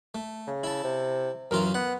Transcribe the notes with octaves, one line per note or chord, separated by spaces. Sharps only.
A3
C#3
E4 A5
C3
F#2 E3 F4 A#4
B3 F#5